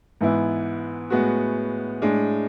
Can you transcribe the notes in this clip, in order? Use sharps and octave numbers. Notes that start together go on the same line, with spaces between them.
G#2 E3 B3 E4
A2 G#3 B3 F#4
A2 G#3 D4